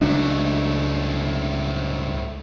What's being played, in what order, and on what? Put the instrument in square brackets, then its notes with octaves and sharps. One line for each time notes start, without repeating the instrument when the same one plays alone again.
[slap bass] C#2 F#3 D4 [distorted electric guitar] G#2 A3